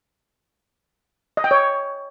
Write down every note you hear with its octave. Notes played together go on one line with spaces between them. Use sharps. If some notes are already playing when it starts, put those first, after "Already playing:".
D#5
G5
C#5